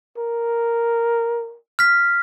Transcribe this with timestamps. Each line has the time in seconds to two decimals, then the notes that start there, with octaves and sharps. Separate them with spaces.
0.18 A#4
1.79 F6 B6